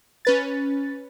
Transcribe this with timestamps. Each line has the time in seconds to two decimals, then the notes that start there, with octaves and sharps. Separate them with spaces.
0.25 C#4 B4 A6